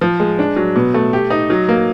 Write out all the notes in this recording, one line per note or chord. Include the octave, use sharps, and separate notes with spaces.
F3
G#3
D4
F#3
B2
A3
G4
D#4
F#3
A#3